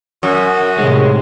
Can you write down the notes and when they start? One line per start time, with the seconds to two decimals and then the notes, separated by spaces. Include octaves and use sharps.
0.23 F#2 F#4
0.79 A2 C3 D#3 G#3